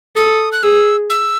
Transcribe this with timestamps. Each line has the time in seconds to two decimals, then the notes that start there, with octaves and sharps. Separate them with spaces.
0.16 A4 D#6
0.52 F#6
0.63 G#4 E6
1.10 E6